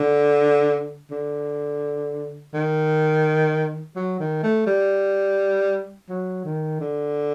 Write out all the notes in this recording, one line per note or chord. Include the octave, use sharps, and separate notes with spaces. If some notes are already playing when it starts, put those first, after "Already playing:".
Already playing: D3
D3
D#3
F#3
D#3
A3
G3
F#3
D#3
D3